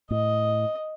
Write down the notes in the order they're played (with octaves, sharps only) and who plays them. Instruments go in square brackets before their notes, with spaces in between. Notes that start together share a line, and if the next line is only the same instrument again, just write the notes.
[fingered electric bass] A2 [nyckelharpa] D#5